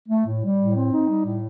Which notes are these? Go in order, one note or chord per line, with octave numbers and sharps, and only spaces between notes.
A3
A2
G3
A2
C4
D#4
G3
A2